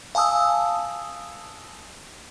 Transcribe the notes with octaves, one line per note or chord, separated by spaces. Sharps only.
F5 G#5 A5 D#6 E6